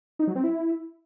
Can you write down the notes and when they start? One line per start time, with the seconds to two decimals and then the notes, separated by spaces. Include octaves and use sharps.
0.19 D#4
0.27 F#3
0.35 C4
0.44 E4